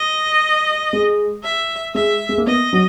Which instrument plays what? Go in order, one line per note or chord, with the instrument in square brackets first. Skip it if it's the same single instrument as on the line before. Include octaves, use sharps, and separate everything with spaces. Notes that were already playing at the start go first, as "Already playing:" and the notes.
Already playing: [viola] D#5
[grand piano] G#3
[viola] E5
[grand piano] G#3 [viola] E5
[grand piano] G#3
A#3
[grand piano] B3 [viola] D#5
[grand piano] F#3